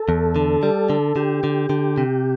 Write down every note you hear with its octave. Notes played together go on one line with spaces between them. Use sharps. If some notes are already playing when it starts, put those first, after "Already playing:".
Already playing: A4
E2
D3
G3
D3
D3 G4
D3
D3
C3